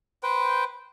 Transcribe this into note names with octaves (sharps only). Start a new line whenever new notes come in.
B4 C5 G5